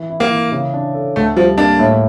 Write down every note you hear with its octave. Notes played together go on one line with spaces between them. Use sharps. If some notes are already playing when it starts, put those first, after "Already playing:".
Already playing: E3
E4
A#3
E3
C#3
D4
A4
D2 A3
F3 G3
A#3 D4
A2